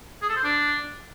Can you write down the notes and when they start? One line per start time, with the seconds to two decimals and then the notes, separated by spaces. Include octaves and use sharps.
0.22 G#4
0.29 A4
0.36 C5
0.44 D4